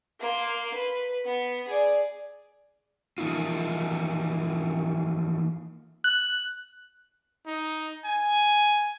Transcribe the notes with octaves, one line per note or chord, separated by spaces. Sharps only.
A#3 C6
B4
B3
G#4 D5
E3 F3 A#3 D#4 F4
F#6
D#4
G#5